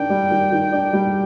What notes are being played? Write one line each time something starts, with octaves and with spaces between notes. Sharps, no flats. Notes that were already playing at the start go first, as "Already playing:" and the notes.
Already playing: D#3 D4 G5
G3
D#3
D#3
D4
G3